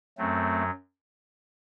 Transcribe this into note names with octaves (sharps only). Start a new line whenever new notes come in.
F#2 F#3 A3 C4